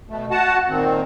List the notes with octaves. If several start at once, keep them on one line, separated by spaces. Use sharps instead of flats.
B2 A3
F#4 F#5 A5
A#2 D#3 C4